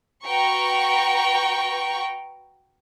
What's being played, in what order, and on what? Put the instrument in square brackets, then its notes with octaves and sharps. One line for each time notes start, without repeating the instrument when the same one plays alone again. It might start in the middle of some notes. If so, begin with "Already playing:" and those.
[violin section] F#4 B4 G5 A#5 C#6